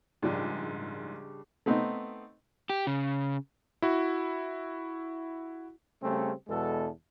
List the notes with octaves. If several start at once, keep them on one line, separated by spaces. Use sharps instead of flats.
A#1 G#2 C#3 G3 D4
A3 B3 C4 D#4
G4
C#3
E4 F#4
C#3 G3 A3 C4 C#4
E2 B2 G#3 A4